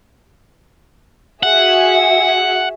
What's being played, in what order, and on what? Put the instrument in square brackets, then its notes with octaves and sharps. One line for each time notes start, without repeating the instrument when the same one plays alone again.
[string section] F#4 G#4 E5 [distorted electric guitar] F#5